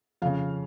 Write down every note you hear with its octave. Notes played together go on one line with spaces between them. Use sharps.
F2 C#3 F5